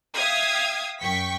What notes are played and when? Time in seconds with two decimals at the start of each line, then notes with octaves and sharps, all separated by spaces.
0.16 E5 F5 G5 D#6 G#6
1.01 F#2 G5 C#6 B6